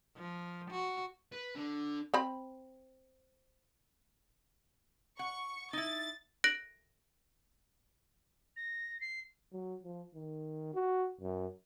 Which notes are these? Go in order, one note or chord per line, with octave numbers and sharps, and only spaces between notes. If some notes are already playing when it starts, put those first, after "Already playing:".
F3
F#4
B4
D3
C4 B5
F#5 C#6
D#4 E4 A6
F#6 A#6 D7 F#7
A#6
C7
F#3
F3
D#3
F#4
F#2